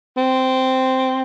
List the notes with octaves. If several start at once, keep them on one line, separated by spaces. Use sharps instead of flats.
C4